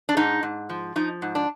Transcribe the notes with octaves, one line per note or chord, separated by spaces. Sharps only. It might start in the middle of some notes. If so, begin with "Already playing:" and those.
D4
G#2 D#4
G#2
F3
F3 D#4
G#2
D4